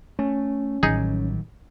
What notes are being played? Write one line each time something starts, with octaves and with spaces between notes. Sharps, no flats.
A3 C#4
A1 D#3 F#3 G3 D#4 G#4